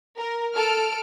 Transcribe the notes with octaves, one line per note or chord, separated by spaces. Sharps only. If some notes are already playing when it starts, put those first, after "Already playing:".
A#4
A4 F6 D7